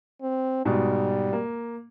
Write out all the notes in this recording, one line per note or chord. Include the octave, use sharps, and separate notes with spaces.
C4
G#2 B2 G3
A#3